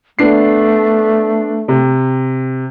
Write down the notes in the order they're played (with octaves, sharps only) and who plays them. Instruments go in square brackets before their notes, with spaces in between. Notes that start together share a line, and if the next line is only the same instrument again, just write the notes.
[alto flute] A3 [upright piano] B3 D4 C7
[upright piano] C3